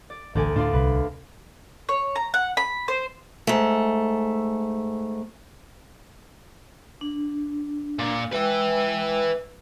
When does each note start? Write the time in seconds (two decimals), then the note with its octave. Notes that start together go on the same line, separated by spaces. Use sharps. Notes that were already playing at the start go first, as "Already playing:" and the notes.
0.10 D5
0.35 A1 D2 D5 G#5
0.56 A2 D4 F4 D5
0.73 C2 B4
1.89 C#5
2.16 A#5
2.34 F#5
2.57 B5
2.88 C5
3.47 G#2 A3
7.01 D4
7.99 A#2
8.33 G#3 B4 E5 G5 E6